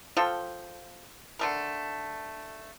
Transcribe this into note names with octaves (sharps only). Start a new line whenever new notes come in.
F3 F4 A4 G5
D3 A3 A#4